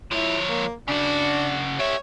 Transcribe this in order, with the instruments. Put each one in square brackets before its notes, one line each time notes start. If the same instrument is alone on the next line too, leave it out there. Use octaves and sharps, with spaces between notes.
[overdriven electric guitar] F3 C#5 [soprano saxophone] E4
[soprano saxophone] A#3
[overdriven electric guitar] C#3 F#4 [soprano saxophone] D4
[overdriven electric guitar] G3 E5 [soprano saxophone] C#5